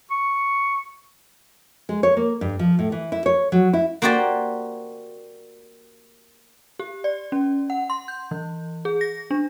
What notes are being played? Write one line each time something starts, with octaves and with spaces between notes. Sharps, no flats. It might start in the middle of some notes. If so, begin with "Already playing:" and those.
C#6
G#3
C#5
A#3
G2
F3
A2
E3
E4
C#5
F#3
E4
A#3 F#4 G4 C5 D5
G4
D5
C#4
F#5
C6
G6
E3
G#4
A#6
D4